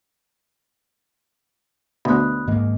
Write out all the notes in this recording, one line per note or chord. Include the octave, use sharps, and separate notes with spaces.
D2 B2 B5 D#6 F#6
G#2 D#3 A#3 D#5